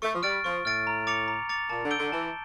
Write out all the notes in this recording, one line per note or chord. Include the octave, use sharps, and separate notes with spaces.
A3 C#6
F3
G3 F6 A6 D7
F3 C#6
A2 F6 A6 D7
A#5
D6 A6 C#7 F7
A#5
D6 A6 C#7 F7
A#2 A5
D3
E6 G6 D7 G7
D3
E3 A5